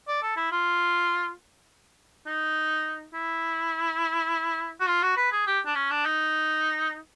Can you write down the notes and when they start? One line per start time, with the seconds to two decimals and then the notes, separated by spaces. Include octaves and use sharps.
0.08 D5
0.22 A4
0.36 E4
0.52 F4
2.26 D#4
3.14 E4
4.80 F#4
4.88 F4
5.02 F#4
5.17 B4
5.32 G#4
5.47 G4
5.66 D4
5.75 C#4
5.91 D4
6.05 D#4